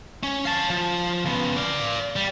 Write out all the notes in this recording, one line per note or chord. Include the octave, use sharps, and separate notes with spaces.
C#4
F5 A5
F3
C#3 B3
D5 F5
G3